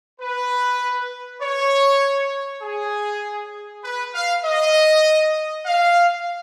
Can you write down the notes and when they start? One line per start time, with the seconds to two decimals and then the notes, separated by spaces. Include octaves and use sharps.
0.20 B4
1.41 C#5
2.62 G#4
3.84 B4
4.14 F5
4.44 D#5
5.66 F5